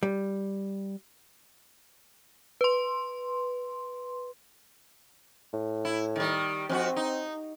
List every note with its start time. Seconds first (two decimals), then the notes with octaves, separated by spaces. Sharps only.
0.03 G3
2.61 B4 C6
5.53 A2
5.85 E4
6.16 D#3 G3
6.70 F2 C4 C#4 F#4
6.96 D#4